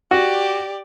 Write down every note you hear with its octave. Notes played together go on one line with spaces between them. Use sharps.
F#4 G4 D5